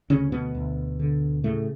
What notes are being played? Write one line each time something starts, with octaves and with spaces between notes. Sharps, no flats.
D2 C#3 C#4
B2 B3
D2
D3
A2 C#3 A3